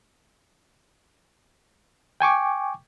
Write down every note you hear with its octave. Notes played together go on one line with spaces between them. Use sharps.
G5 G#5 C#6 D6